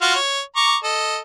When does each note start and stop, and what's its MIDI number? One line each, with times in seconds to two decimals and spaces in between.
0.02 0.15 65
0.02 0.15 66
0.02 0.15 77
0.15 0.40 73
0.56 0.76 82
0.56 0.76 85
0.56 0.76 86
0.84 1.18 69
0.84 1.18 75